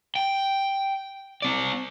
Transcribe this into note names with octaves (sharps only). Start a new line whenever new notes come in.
G5
C4 D5